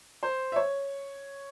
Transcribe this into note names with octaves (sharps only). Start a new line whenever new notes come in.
C5
E5
C#5